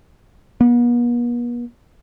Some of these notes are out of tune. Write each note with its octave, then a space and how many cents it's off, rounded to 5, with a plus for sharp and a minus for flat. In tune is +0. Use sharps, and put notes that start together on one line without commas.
B3 -45